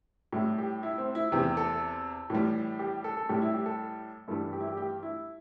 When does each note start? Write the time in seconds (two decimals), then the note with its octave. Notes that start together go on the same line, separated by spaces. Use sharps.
0.33 A2 G3 E4
0.58 G4
0.83 E4
0.98 C4
1.15 E4
1.32 E2 C3 E3 G4
1.57 A4
2.30 A2 E3 G3
2.79 G4
3.04 A4
3.17 A4
3.29 A2 G3 G4
3.42 E4
3.54 G4
3.66 A4
4.28 G2 E3 G3 A4
4.53 G4
4.60 E4
4.67 G4
4.77 G4
5.03 E4